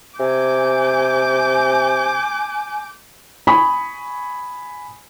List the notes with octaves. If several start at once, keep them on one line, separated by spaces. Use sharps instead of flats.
C3 G#5 D6 G6
G#5 B5 C#6 D#6